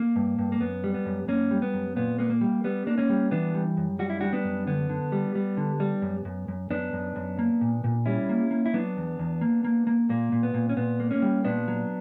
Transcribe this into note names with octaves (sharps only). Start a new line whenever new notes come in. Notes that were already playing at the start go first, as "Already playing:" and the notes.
Already playing: A#3
G2
G2
A#3
F#2 B3
G3
B3
F#2
F#2 A#3 C#4
G3
B3
F#2
A#2 B3
A#3 B3
A#3
G3
G3 B3
A#3 D4
A#3 C#4
G3
E3 B3 D4
G3
F#2
G3 F#4
E4
G3 D4 F#4
B3 D4
F#2
D3 B3
D3
G3
G3
D3
G3
F#2
F#2
F#2
F#2 B3 D4
F#2
F#2
A#3
A#2
A#2
G3 C#4 E4
A#3
A#3
E4
F#3 B3 D4
E2
E2
A#3
A#3
A#3
A#2 A#3
A#2
B3
A#2
C#4
A#2 B3
A#3
A#3 C#4
G3
A#2 B3 D4
F#3